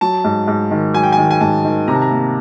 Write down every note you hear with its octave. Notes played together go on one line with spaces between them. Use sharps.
F#3 A5
G#2
G#2
D#3
F#3 G#5
G5
G#5
D#3
G#5
G#2 A5
D#3
C3 A#5
A5
A#5
A#3